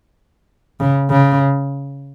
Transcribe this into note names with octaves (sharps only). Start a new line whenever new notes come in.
C#3
C#3